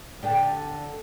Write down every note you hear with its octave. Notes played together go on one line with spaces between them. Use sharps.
D3 D4 G4